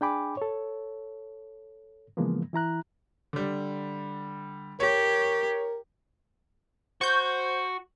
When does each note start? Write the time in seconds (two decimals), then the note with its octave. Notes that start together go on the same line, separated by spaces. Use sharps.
0.01 D4 G#4 G5 G#5 B5 D6
0.37 A4 C#5
2.17 C#3 E3 F3 G#3 A#3 B3
2.53 E3 E4 A#5 F#6
3.33 D3 G3
4.80 G4 A#4 C#5
7.01 F#4 C5 C#6 G6